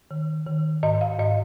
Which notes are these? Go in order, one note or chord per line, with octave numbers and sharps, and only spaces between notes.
D#3
D#3
G#2 D#5
F5
G#2 D#5